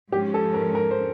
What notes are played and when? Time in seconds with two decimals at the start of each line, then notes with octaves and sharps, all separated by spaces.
0.12 G#2 F3 G#3 C#4 G4
0.34 A4
0.54 A#4
0.75 A#4
0.91 C5